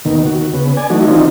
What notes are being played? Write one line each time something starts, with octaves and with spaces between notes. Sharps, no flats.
D#2 B2 D#3
D#2 F#4
C#3 B3
D5 G#5
E3 F#3 A3 D#4 F#4
D#3 E3 C4 D4 D#4 F4